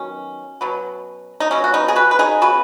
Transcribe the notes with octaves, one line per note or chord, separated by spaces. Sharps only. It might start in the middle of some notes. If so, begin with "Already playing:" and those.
Already playing: D#3 F#3 B3 C#4
B2 F#3 B3
D#4
C#3 F#3 B3 C#4
F#4
B3 D#4
G#4
F#4 B4
B4
D#4 G#4
C#3 B3 F#4 B4